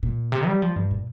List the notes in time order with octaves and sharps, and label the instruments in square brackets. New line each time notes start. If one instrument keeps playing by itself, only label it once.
[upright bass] A#2
C3
G3
F3
G2
A#2